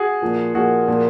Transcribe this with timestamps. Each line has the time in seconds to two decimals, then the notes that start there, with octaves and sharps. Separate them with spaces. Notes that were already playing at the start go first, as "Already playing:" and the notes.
Already playing: F#4 G#4
0.22 A#2 F3 A#3
0.54 A#2 F3 A#3 F#4 G#4
0.88 A#2 F3 A#3